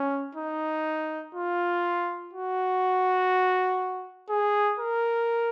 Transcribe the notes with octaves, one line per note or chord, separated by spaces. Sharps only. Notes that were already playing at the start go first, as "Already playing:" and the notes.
Already playing: C#4
D#4
F4
F#4
G#4
A#4